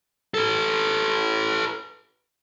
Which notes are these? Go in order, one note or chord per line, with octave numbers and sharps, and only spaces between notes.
A4 B4